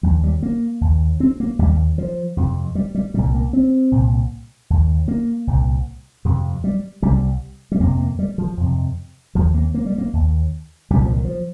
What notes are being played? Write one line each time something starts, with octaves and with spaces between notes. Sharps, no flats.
D#2 F3
G3
A#3
D#2
C4
A#3
D#2 G3
F3
F2 C3
G3
G3
C2 A#2 G3
A#3
C4
C2 A#2
D#2
A#3
C2 A#2
F2 C3
G3
C2 C3 G3
G3
F2 C3 A#3
A#3
G3
F3
F2 C3
D#2 F3
A#3
A#3
G3
A#3
D#2
C2 A#2 G3
F3
D#3
F3